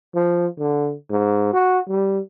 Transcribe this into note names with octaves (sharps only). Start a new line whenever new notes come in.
F3
D3
G#2
F#4
G3